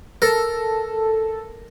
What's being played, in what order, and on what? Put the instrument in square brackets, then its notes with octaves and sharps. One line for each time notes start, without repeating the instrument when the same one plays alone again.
[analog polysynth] A4 [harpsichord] A#4